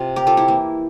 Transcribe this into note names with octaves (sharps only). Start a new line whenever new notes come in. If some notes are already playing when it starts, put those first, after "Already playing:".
Already playing: C3 F4
G4 A#4
F4 A4
E4 G4
E3 A#3